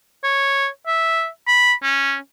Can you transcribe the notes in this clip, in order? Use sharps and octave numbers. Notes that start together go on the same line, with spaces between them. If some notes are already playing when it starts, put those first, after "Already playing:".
C#5
E5
B5
C#4